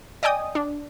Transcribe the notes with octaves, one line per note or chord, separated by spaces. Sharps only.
D5 D#5 G5 G#5 D#6
D4